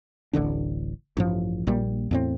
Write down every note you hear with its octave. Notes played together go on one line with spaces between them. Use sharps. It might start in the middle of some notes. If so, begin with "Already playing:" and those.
D1 A1 D3 D4
A1 G2 F3
A#1 A#2 G3
E2 A2 C4